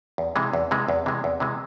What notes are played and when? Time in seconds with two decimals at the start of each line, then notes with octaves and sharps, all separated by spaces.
0.18 E2
0.36 C3 E3 G#3
0.53 E2
0.71 C3 E3 G#3
0.88 E2
1.06 C3 E3 G#3
1.24 E2
1.40 C3 E3 G#3